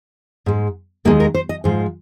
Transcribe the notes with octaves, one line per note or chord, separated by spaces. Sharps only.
G#2 G#3
D#2 D#3 G#3 A#3
A#4
C5
D#5
G#2 F3 G#3 C5